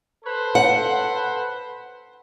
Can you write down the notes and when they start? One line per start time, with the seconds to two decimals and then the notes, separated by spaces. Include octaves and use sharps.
0.24 A4 B4 C5
0.55 F#5